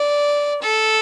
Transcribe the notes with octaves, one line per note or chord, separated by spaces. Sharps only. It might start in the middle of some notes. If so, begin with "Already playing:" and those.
Already playing: D5
A4